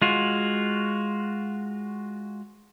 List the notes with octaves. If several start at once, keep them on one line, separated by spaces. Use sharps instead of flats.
G#3 F4 F#4